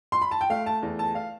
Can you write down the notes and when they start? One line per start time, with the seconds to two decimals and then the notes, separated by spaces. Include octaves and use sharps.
0.12 C6
0.22 B5
0.31 A5
0.41 G5
0.50 A3 F5
0.66 A5
0.82 E2
0.99 A5
1.15 F5